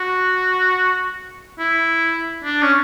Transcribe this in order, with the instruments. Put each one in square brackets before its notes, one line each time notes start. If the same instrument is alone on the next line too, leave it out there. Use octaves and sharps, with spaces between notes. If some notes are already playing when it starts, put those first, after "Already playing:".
Already playing: [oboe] F#4
E4
D4
C#4